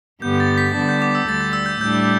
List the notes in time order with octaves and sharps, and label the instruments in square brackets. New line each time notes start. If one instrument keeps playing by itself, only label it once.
[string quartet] G2 D3 B3 G4 [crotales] G6
[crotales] A6
B6
[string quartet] D3 G3 B3 D4 [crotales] A6
[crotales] G6
D6
E6
[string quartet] D2 D3 G3 [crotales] A6
[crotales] G6
E6
G6
[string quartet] A2 G3 D4 [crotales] G6